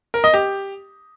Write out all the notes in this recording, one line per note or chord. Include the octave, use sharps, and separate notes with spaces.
A#4
D#5
G4